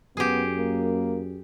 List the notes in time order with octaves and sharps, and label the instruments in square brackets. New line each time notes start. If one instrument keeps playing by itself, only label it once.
[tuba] F#2 [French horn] B3 [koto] G4 G#4
[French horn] A#3